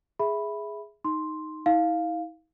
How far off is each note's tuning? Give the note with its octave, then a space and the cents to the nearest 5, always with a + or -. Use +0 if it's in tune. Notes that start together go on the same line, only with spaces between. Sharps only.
G#4 +0 E5 +0 B5 +0
D#4 +0 C6 +0
E4 -45 F5 +0